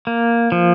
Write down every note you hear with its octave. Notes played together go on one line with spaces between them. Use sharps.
A#3
F3